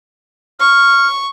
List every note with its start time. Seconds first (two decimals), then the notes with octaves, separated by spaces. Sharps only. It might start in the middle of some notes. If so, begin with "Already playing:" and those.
0.60 C#6 F6